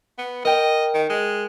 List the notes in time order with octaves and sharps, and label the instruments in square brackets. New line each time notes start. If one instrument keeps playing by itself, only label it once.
[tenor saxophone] B3
[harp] A#4 G5 [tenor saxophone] D#5
[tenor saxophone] D#3
G#3